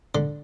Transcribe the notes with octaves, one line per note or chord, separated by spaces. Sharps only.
D3